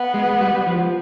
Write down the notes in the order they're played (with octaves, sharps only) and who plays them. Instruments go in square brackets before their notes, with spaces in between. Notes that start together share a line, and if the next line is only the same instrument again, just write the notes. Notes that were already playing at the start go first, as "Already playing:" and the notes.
Already playing: [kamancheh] B3
[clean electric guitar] G#3
G3
F3